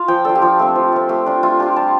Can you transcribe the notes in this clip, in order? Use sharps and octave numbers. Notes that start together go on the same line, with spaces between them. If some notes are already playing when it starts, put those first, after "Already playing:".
Already playing: F4 F5
F3 G5
D4 F4 A4
G4
F3 F4
A3 C4
F3
A3 C4
A3 G4
D4 F4
A3 F4
D4 F4 G4
G3 A5